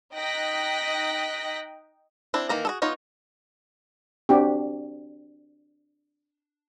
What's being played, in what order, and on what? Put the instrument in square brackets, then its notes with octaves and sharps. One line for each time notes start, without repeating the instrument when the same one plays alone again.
[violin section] D#4 D#5 G5 F#6 A#6 B6
[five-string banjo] C4 D4 E4
D#3 E3 A#3 A#5
F#4 G#4 A4
B3 D#4 F4 C#5
[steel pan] C4 D4 F#4 G4